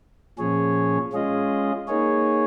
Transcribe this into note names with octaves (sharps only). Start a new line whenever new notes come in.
A#2 F3 C#4 G#4 C#5
G#3 C#4 F4 G#4 D#5
A#3 D#4 G#4 C#5